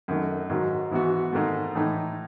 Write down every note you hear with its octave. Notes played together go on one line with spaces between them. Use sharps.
F#2 D#3 A3
G#2 D#3 F#3
G#2 E3 B3 F#4
G#2 D#3 A3
A2 E3 A3 D#4